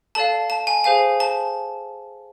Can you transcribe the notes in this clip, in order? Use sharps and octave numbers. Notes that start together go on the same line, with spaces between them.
A4 D5 F5 A5
A5
G#5
G#4 C5 F5 G#5
A5